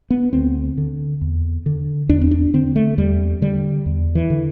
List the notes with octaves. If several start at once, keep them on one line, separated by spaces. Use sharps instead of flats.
B3
D2 C4
D3
E2
D3
E2 D4
C4
D4
D3 C4
A3
E2 G3
D3 G3
E2
E3
D3